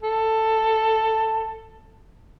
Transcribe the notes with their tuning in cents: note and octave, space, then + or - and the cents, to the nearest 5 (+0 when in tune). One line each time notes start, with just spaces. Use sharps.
A4 +10